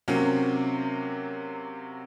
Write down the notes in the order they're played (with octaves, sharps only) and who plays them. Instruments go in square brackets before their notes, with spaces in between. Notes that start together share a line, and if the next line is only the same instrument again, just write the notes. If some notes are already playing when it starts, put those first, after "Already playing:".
[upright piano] C3 F#3 A#3 C4 C#4